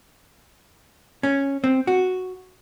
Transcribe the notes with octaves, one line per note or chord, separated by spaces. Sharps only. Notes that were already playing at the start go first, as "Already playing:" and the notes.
C#4
C4
F#4